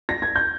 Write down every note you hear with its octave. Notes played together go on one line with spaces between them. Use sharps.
A#6
G#6
G6